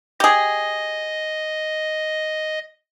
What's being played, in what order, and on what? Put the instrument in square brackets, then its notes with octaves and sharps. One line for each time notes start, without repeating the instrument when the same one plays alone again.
[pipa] G4 G#4 [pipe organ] D#5